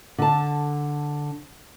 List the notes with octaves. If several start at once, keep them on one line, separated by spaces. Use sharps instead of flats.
D3 A5